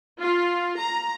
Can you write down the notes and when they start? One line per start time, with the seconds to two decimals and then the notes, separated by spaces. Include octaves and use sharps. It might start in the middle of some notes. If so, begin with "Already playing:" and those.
0.22 F4
0.79 A#5